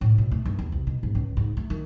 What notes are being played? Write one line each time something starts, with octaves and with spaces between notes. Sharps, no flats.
A2
B2
A3
G1
E2
C2
B2
G#2
C#2
G#2
A3
D#3